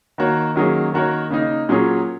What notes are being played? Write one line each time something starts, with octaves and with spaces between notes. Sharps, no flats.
D#3 A#3 F#4 C#5
D#3 F#3 A#3 C#4 G#4
D#3 A#3 F#4 A#4 C#5
C#3 A#3 D#4
A#2 F#3 C#4 G#4 C#5